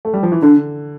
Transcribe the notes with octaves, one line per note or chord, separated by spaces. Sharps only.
A3
G3
F3
E3
D3 D4